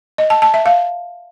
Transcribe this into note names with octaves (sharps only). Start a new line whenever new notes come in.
D#5
A5
A5
E5
F5